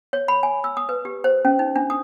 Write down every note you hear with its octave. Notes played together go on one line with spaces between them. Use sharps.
C#5
B5
G#5
E6
D#6
B4
G4
C5
C#4
D#4
D4
D#6